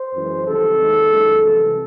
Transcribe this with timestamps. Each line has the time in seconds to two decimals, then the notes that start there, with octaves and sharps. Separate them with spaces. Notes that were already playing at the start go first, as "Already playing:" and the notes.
Already playing: C5
0.13 F#2 E3 G#3
0.46 C2 C3 D#3 A4
0.79 D#2 D#3 G#3
1.11 F#2 D#3 G#3
1.44 C2 C3 E3